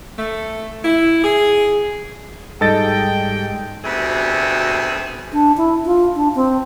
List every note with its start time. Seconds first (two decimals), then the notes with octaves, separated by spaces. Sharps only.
0.18 A3
0.84 E4
1.23 G#4
2.61 G#2 G3 A4 D#5 G5 A6
3.84 D2 B2 C4 G4 G#4 E5
5.33 D4
5.57 E4
5.85 F4
6.15 D4
6.35 C4